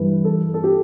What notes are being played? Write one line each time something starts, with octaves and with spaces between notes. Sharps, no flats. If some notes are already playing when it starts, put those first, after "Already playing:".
Already playing: G2 E3 G3 B4
A4
A4
G4